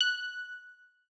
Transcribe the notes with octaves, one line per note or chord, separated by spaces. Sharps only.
F#6